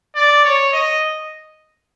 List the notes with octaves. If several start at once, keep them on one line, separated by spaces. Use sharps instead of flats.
D5
C#5
D#5